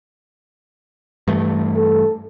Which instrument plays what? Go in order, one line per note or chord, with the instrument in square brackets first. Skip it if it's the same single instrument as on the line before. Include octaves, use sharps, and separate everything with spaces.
[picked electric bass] G2 E3 A3
[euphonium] A4